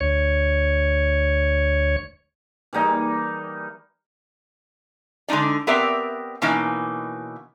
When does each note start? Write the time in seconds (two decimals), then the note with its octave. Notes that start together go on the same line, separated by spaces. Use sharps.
0.01 D2 C#5
2.73 E3 G3 A#3 D#4
5.28 D3 G#3 D4 D#4 D5
5.67 B3 C4 G4 A#4 D5 E5
6.42 B2 E3 A#3 C#4 D#4